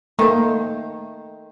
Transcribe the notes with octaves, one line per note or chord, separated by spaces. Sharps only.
D#3 A3 A#3 C5